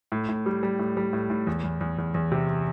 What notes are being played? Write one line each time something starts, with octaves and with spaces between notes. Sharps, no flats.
A2
A2
G3
G3
A2
G3
A2
A2
E2
E2
E2
E2
E2
C3